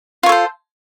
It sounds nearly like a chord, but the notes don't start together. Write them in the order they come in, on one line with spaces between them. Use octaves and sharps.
F4 C#5 A4 C5